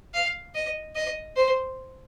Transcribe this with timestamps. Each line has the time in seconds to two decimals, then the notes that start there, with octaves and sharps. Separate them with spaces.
0.14 F5
0.55 D#5
0.96 D#5
1.36 C5